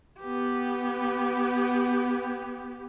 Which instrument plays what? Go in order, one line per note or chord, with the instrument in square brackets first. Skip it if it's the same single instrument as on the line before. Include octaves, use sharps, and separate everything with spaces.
[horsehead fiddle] B3 G4